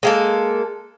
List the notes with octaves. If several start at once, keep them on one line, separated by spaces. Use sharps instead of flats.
G#3 A#3 A4